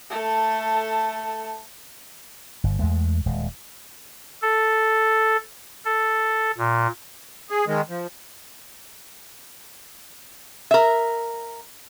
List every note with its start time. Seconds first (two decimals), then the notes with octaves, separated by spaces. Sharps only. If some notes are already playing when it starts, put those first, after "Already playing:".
0.10 A3 A4
2.64 G1
2.79 E2 G#3 A3
3.26 D#1 G#3
4.42 A4
5.85 A4
6.58 A#2
7.50 G#4
7.67 D#3 G#3
7.89 F3
10.71 A#4 E5